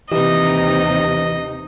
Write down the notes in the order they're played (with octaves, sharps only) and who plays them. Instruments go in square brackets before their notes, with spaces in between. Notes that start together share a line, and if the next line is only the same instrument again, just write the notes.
[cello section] D#2 C3 D#4 [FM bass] E3 [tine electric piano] G4 B4 [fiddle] D#5